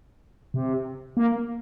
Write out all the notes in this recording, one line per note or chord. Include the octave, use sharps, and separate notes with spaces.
C3
A#3